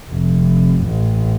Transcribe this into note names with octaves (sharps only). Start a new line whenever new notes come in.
F1
A1